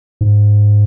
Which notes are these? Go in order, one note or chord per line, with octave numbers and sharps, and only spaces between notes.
G#2